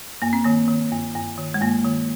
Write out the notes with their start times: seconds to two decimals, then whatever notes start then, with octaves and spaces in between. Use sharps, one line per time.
0.22 G2 A#3
0.33 C4
0.44 D#3 A#3
0.68 D#3
0.92 G2
1.15 G2
1.38 D#3
1.54 G#3
1.61 G2 A#3
1.85 D#3